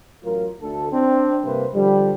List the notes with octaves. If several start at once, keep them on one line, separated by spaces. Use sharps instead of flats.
A1 F#3 F4 A#4
D2 A4
C4 D4
G2 C3 A#3 B4 C5
D3 F3 G3